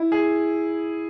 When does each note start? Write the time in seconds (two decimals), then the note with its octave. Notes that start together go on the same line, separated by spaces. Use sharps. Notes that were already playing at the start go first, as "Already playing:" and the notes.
Already playing: E4
0.12 G#4